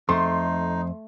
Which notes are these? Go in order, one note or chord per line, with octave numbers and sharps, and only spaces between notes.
F2 A3 D#4 C6